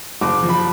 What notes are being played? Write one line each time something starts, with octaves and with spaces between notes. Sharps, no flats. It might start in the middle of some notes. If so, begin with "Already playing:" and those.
F#1 D6
F3
B5